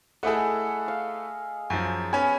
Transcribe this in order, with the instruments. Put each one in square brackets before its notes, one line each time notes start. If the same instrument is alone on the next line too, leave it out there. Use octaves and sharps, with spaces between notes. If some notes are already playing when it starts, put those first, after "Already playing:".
[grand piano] A3 E4 A4 [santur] G#4 D#5 F#5
[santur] F5
[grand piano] F#2 F3
[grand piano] B3 C#4 [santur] G#5